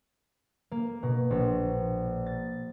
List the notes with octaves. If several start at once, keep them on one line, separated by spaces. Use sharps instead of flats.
A#3
B2
A#1
A6